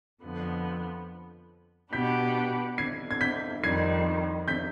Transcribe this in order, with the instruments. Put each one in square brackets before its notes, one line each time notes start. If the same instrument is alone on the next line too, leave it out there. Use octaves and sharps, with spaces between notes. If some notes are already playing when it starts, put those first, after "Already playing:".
[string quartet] F2 D3 F3 B3
[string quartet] B2 B3 D4 G4 B4 [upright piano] G6 B6
[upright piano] G#6 C7
G#6
G6 B6
[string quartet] F2 D#3 G3 [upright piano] G#6 C7
[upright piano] G6 B6